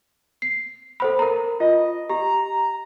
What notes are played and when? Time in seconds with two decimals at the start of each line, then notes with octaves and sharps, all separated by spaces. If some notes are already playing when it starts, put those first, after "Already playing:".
0.42 C7
1.00 A4 C5 B5
1.19 A#4 A#5
1.60 F4 D#5
2.09 G4 A#5